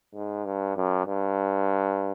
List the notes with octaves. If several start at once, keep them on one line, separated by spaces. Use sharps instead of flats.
G#2
G2
F#2
G2